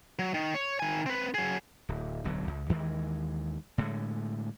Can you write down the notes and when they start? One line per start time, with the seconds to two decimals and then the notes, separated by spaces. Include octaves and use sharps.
0.19 F#3
0.34 D#3
0.54 C#5
0.79 D#3 G#5
1.06 C4 B4
1.34 F#3 G#4
1.89 D1
2.24 D1 B1 D3 F#3
2.47 C#2
2.69 D#2 D#3 E3 G#3
3.78 A2 D3 G#3